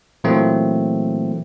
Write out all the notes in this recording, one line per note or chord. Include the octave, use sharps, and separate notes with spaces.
A#2 E3 F#3 A3 A#3 C4